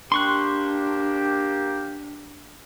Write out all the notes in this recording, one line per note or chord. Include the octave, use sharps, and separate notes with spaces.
A#3 D4 G4 C6 C#6 F#6